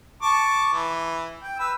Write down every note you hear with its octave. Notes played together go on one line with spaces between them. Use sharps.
A5 C#6 D6
E3
G5
B4 E6